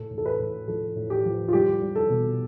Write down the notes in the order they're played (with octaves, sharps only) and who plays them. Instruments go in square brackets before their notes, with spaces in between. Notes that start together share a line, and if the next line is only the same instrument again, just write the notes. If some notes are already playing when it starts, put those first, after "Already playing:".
Already playing: [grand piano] A2 A4
A2
A4
B4
A2
F3 A4
A2
G4
F3
F4
G3 G4
G3
A4
B2